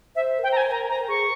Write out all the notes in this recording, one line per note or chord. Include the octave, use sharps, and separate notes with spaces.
C5 E5
A#4
C5 G5
A#5
G#5
A#4 A#5
C5 A#5
A#4
G#4 C#6